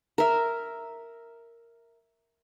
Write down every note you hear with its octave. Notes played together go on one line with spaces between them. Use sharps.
A#4 E5